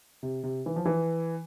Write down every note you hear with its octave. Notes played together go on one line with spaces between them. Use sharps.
C3
C3
E3
F3
E3